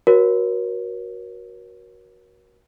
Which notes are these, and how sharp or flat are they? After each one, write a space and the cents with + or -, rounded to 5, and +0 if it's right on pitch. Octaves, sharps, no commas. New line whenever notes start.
F#4 +0 A#4 +35 C#5 -20